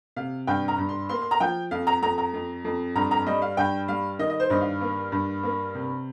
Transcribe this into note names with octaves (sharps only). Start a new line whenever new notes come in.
C3 F5
G2 G5
A#5
G2
C6
A#3 C6
C6
A#5
F3 G5
F2 F5
A#5
F2 A#5
A#5
F2
F2
G2 A#5
A#5
G3 D#5
F5
G2 G5
G3 F5
D#3 D#5
D#5
C5
G2 D#5
F5
A#3
G2
A#3
C3